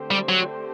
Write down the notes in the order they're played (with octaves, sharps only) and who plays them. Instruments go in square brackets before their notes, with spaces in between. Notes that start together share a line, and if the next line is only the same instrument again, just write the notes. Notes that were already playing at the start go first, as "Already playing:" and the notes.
Already playing: [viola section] D3 A3 C4 G4 C5
[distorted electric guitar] G3
F#3